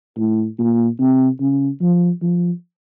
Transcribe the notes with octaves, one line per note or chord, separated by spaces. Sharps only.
A2
A#2
C3
C#3
F3
F3